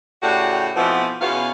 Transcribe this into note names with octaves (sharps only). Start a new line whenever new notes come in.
A2 C#3 F#4 G4 D5 F#5
B2 E3 F3 A3 B3 C4
E2 B2 B3 C#4 F5